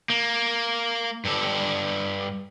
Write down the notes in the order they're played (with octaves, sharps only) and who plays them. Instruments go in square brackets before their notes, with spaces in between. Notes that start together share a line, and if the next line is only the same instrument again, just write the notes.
[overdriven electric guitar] A#3
G2 A4